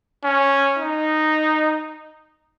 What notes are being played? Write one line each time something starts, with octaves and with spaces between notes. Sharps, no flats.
C#4
D#4